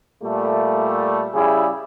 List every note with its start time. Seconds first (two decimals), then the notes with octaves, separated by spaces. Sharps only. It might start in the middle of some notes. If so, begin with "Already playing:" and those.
0.23 A#2 G3 A3
1.34 C#3 G3 E4 G#4